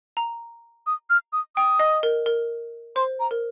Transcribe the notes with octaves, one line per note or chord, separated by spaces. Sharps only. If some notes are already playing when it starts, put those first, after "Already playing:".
A#5
D#6
F6
D#6
G5 D#6
D#5
A#4
A#4
C5 C6
A#5
A#4